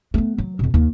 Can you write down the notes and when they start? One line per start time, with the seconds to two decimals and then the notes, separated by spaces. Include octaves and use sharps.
0.14 A3 B3
0.38 F#3
0.59 F2 B2
0.74 D#2